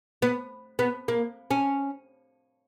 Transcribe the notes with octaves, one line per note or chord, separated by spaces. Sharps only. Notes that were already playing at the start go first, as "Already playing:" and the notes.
B3
B3
A#3
C#4